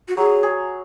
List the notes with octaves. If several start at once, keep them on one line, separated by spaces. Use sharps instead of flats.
F#4
F#3 G#4
G#4